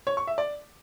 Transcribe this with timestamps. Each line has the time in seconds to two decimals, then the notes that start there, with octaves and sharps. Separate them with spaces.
0.07 C#5
0.17 C#6
0.27 E5
0.38 D5